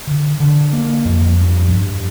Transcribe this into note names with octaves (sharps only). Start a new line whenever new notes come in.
D3
D3
A#3
F2
G2
G2